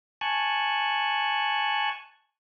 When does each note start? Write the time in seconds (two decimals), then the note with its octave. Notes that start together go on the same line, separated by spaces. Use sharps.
0.21 G#5 A5 C#6 F#6